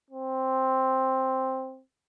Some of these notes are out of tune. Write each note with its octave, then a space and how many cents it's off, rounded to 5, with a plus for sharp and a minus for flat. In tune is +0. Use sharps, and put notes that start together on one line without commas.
C4 +5